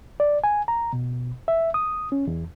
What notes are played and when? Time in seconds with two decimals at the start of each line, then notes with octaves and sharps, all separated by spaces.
0.20 D5
0.44 G#5
0.68 A#5
0.93 B2
1.48 E5
1.74 D#6
2.12 C#4
2.27 E2